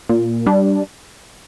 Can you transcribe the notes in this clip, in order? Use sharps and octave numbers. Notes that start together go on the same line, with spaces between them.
A#2
G3 D4